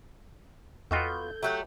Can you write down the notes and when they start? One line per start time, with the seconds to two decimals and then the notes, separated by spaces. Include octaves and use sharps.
0.91 E2 B3 F4 F#4 A4 D#5 G5 G6
1.43 F#3 A3 G4 F#5